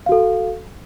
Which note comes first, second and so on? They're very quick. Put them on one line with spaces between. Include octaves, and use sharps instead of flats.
F5 F#4 A4